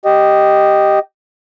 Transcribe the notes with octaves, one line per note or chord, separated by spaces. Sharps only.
G4 D#5